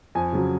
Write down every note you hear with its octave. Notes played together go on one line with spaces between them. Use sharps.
F2 G#5
C#3 F#3